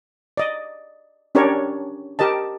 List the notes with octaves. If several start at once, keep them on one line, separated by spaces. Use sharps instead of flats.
D5 D#5
C#4 D4 G4 A#4 C#5 D5
G4 A#4 D#5 A5